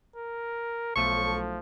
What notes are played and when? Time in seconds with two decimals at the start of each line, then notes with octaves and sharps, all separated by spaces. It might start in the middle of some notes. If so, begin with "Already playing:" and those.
0.16 A#4
0.96 B1 F3 A3 C#6